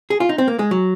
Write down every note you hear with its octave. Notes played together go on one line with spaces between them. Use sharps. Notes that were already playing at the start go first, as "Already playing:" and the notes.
G#4
F4
D#4
C4
A#3
G#3
F#3